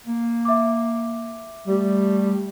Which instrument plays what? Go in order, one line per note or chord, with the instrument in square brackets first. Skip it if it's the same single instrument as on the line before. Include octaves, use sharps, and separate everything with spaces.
[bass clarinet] A#3
[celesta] E5 D6
[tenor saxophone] G3 [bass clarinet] A3